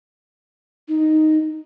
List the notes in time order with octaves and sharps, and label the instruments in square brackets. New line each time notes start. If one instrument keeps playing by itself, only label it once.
[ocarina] D#4